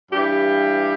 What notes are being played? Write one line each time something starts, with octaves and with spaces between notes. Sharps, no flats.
G2 E3 G4